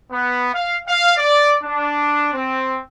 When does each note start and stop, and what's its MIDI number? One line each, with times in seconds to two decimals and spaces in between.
0.11 0.50 59
0.53 0.76 77
0.87 1.12 77
1.18 1.56 74
1.63 2.30 62
2.33 2.78 60